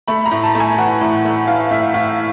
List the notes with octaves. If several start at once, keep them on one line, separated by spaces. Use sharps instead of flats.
A3 B5
A#5
A2
A5
A3
G#5
E3 F#5
A2
A3
E3 F5
A2 E5
A2 F5